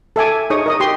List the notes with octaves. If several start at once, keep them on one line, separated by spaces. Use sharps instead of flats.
A4 E5 G#5 D6
D#4 G#4 C#5 C#6 D#6
A#4 D#5 D#6
G4 C6